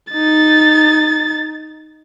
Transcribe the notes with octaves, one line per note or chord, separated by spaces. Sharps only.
D#4 A6